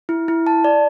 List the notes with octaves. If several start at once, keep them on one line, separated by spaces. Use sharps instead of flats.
E4
E4
A5
D5